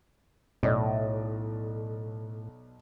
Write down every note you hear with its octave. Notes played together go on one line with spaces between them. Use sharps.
B1 A2 D5 D#5